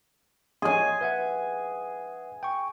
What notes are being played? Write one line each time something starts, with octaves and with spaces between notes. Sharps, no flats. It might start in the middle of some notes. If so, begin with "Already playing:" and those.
G#4 C#5 D#5 G#5 C6
B4 E5 F#5
G5 C#6